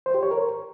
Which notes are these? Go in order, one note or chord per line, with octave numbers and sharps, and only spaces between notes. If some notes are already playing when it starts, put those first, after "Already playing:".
C5
G4
C#5
A#4